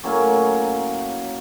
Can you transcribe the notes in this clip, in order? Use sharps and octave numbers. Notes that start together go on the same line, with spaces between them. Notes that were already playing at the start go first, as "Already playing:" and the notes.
A2 F#3 A#3 C#4